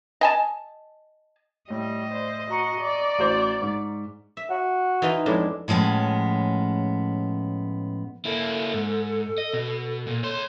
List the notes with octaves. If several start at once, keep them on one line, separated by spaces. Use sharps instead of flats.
D#5 G#5 A5
A2 G3 D#5
C5 D5
F#4 A#5 C#6 C#7
D5
A1 F#4 C5
G#2
E5
F#4
E3 D#4 F4
F2 A2 G#3 D4
A2 F3 G#3 B3 C#4
A#3 E4 A4
G#2
D#5
B2
A#2
C#5 C6